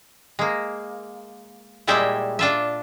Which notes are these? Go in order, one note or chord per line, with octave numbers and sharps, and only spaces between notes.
G#3 A#3
A#2 G3 G#3 E4 E5 G5
D4 F4 E5